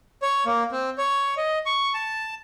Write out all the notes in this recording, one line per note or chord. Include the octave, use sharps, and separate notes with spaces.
C#5
A#3
C4
C#5
D#5
C#6
A5